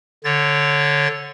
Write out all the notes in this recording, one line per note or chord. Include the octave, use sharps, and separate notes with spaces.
D3 C#5 A6